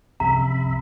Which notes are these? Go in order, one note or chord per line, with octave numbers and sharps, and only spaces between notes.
C2 F#2 C3 F3 E5 A#5 B5